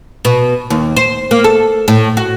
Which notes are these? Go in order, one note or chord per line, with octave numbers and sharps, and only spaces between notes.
B2
D#2
C5
A#3
A4
A2
F#4